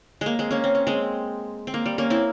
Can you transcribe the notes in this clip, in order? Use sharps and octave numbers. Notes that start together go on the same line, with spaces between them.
G#3 A#3
G#3 C4
A#3 C#4
C4
C#4
G#3 C4
C4
A#3
G3
A#3 C#4
C4 E4